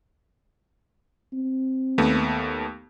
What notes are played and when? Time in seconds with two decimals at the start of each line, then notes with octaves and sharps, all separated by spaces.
1.33 C4
1.98 D#2 A3 B3